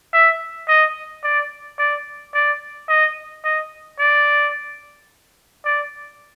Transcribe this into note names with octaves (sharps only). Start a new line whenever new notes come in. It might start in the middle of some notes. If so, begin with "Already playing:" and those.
E5
D#5
D5
D5
D5
D#5
D#5
D5
D5